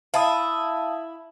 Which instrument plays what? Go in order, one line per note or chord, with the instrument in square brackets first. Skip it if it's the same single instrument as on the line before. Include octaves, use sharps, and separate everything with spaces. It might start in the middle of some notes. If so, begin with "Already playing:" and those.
[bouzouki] E4 [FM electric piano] F5 A5 D#6